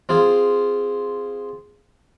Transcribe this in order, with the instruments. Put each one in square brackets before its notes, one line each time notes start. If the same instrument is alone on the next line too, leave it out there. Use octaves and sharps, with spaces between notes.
[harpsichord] C4 F4 G#4